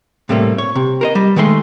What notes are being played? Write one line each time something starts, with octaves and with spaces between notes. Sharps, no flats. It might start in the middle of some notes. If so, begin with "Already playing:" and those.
A2 C3 G3 A3 A#3
C#5
C3
A#4 C5 D#5
G3
D#3 G#3 A3 C#5 C6